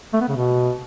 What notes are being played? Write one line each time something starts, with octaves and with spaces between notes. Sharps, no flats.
A3
B3
C#3
B2